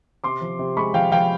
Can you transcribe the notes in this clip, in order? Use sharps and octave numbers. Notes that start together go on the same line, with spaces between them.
C3 C6 D6
F3
C3
G#3 B5 C#6
F3 F5 G5
F3 F5 G5